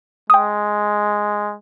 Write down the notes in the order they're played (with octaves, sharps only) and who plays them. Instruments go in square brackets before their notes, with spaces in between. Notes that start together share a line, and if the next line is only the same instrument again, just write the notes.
[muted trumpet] G#3 [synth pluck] G5 D#6